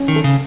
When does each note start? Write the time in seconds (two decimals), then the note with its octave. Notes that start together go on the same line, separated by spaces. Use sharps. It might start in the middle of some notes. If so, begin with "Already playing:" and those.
Already playing: C#4
0.08 D#3
0.16 A4
0.24 C#3